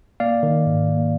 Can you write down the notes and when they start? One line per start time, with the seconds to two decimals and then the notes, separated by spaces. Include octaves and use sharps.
0.20 A#3 D5 F5
0.43 D#3
0.66 G#2
0.89 A#3